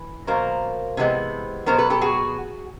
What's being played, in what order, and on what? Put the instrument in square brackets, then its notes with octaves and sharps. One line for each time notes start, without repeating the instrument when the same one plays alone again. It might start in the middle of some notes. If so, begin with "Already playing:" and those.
Already playing: [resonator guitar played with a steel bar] E3
B2 F#3 A#3 A#4 C5
C3 E3 G#3 B3
B2 F#3 B3 A#4 C5
A4 B4
G4 A4
F#4 G#4